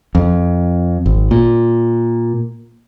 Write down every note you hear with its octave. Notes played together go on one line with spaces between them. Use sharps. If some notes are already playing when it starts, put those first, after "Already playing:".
F2
G#1
A#2